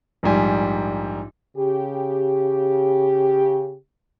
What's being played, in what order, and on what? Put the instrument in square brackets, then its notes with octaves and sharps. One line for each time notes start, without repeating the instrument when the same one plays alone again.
[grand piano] A#1 G#2 G3 G#5
[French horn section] C#3 G4